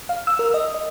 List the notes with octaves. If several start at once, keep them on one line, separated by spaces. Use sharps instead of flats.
F5
E6
A#4
D#5
D#5